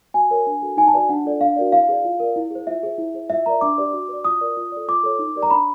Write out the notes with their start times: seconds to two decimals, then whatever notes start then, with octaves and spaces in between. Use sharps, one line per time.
0.14 F#4 G#5
0.31 A#4 C#5
0.47 D4
0.62 F#4 A4
0.77 D#4 G#5
0.88 A5
0.94 F#4 B4 D5 G#5
1.09 D4 F#5
1.24 F4 A4 D5
1.41 D4 F5
1.56 F#4 A#4 D5
1.72 E4 F5
1.89 G#4 B4 D5
2.05 F4
2.20 A#4 D5
2.36 E4
2.51 G#4 C5
2.67 F4 E5
2.83 G#4 C5
2.98 E4
3.14 G#4 C5
3.30 F4 E5
3.46 A#4 D5 A#5
3.61 D4 D6
3.78 G4 B4 D5
3.93 F#4
4.09 B4 D5
4.25 F4 D#6
4.41 A#4 D5
4.57 F4
4.72 A4 D5
4.88 F4 D6
5.03 A4 C#5
5.19 D#4
5.36 G4 A#4 D5
5.43 A#5
5.51 D4 B5